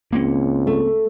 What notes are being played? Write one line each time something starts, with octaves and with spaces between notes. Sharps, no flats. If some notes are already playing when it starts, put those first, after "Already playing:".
C#2 A#3 C4 C#4
A3